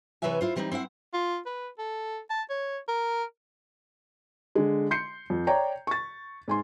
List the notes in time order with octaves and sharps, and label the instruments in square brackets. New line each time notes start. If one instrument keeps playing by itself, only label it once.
[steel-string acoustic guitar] C3 E3 B4 C#5 E5 G#5
E4 F4 C5
E3 G3 C4 D4 D#4
C4 E4 C5 F#5
[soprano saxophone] F4
B4
A4
A5
C#5
A#4
[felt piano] D3 G#3
C6 G6 C7 C#7
F2
C#5 D5 G5 A#5
C#6 A6
G#2 G#5 C6